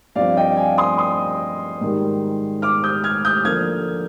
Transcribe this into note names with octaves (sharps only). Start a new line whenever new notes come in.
G2 F3 C4 D5 F5
D#5 G5
F5 G#5
C6 D#6
C6 D#6
G#2 D#3 G3
D6 F6
D#6 G6
F6 G#6
D#6 G6
D3 F3 A#3 F6 G#6